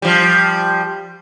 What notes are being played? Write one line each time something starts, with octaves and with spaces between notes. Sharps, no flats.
F3 G3